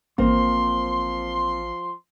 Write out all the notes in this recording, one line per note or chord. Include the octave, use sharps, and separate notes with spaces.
A1 F3 A#3 C4 C6